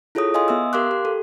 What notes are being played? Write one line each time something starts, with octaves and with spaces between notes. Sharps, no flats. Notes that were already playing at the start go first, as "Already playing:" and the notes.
E4 F4 G#4 A4 C#5 D#6
D#5 F5 G#5 C6 D#6
B3 E5 D#6 E6
G4 A#4 F5 C6 D6 F#6
G4
A4